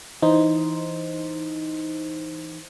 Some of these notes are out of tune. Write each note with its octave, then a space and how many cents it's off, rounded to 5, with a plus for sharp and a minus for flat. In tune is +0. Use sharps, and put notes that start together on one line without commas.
E3 +0 D#4 +0 C5 +0